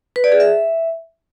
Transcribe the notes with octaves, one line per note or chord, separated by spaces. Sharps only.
B4
D5
G#4
E5